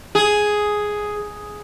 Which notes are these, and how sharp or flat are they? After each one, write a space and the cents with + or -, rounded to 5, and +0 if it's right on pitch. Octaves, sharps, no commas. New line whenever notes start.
G#4 +5